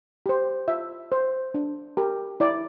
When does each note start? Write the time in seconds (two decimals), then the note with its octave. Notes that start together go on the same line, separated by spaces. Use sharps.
0.26 G4 C5
0.68 F4 E5
1.12 C5
1.54 D4
1.97 G4 A#4
2.40 E4 D5